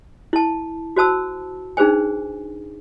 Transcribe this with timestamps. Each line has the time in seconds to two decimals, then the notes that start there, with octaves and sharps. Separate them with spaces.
0.33 E4 A5
0.96 F#4 C5 A5 E6
1.77 D4 D#4 G#4 B4 C5 G#5